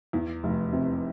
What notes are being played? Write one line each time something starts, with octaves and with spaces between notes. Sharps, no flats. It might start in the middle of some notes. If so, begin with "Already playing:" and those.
E2
F1
C3